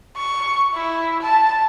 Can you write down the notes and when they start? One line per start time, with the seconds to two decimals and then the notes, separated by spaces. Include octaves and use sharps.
0.17 C#6
0.74 E4
1.22 A5